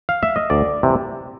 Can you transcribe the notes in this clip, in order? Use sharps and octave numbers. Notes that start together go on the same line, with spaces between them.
F5
E5
D#5
D2 D5
C3 E3